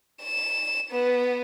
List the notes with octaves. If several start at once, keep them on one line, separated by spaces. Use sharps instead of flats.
E7
B3